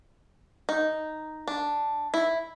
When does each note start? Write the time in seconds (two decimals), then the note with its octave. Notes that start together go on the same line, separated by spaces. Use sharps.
0.69 D#4
1.48 D4
2.14 E4